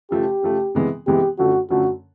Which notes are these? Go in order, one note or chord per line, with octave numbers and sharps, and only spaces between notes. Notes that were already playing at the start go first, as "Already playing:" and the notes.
C#3 F3 A3 G4
C#3 F3 A3
C3 E3 G#3 B3
C3 E3 G#3 B3 G4
F#2 D3 F3 A3 F#4
F#2 D3 F3 A3 F#4